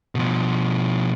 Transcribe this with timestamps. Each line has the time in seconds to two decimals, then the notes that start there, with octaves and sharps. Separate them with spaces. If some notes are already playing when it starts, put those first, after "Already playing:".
0.15 B2 F3